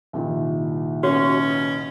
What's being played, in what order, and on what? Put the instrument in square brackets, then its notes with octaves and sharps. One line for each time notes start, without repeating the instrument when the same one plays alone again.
[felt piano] C2 A#2 D#3
[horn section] B2 C#4 [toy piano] F#4 G4 C#5